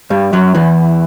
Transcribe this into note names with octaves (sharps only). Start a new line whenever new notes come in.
G2 G3
F#2 F#3
E2 E3